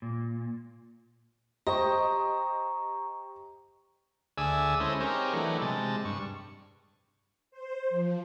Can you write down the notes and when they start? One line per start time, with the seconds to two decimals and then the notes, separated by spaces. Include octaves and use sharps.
0.02 A#2
1.67 G4 C5 D#5 A#5 C#6
4.38 D2 G#4 D5 E5 G#5 E6
4.80 G#3 C#4 E4 A4 C5 D#5
5.00 C4 D#4 G4 G#4 A#4 C#5
5.33 E3 F#3 A3 D4 D#4
5.61 C3 G#3 A5
6.05 G2 C#6
7.51 C5
7.90 F3